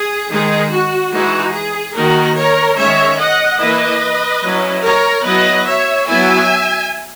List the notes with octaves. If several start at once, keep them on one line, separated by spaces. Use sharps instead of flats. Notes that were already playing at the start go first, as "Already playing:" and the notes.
Already playing: G#4
D#3 G#3 D#4 G#4
F#4
E3 G#3 D#4 F#4
G#4
D#3 A#3 D#4 F#4 A#4
A#4 C#5
D#3 G#3 C#4 C#5 E5
D#5 F#5
E3 A#3 E4 B4 D#5
F#3 C#4 E4
A#4 C#5
F#3 B3 E4 B4 D#5
C#5 E5
F#3 B3 E4 E5 G#5